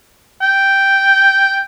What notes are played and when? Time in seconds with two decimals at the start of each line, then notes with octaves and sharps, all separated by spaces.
0.42 G5